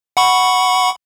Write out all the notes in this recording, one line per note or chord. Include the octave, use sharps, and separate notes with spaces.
F#5 B5 C#6